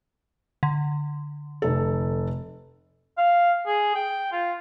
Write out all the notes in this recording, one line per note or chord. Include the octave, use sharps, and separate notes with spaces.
D3
F1 A4
F5
G#4
G5
F4